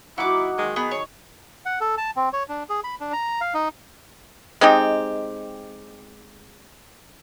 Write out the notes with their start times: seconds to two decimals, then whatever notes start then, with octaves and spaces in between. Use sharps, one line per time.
0.18 F#3 D#4 E4 F#5 D6
0.58 D#3 G#3
0.76 B3 G#4
0.91 C#5
1.65 F#5
1.80 A4
1.98 A5
2.16 C4
2.33 C#5
2.49 D4
2.70 G#4
2.84 B5
3.00 D4
3.13 A#5
3.41 F5
3.54 D#4
4.61 G#3 C4 D#4 G4